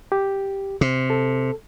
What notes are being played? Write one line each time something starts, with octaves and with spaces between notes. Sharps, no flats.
G4
C3
A4